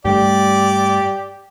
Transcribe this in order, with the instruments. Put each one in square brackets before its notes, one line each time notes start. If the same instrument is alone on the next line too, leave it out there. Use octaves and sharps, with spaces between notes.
[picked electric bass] G2 G3 A3 [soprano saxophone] G4 [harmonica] D5